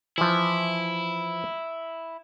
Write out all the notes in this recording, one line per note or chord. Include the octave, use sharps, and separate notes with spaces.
E3 F3 E4